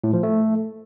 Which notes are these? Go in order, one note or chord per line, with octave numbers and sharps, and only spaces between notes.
A2
F3
A3